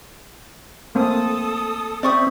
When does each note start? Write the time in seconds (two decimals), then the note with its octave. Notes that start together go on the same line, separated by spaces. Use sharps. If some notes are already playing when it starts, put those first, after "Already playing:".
0.95 A3 A#3 C4 A4 D#6
2.03 C4 D5 E5 C#6 D#6